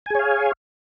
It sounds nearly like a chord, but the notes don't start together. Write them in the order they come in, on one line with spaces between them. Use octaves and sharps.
G#5 G#4 C#5 F5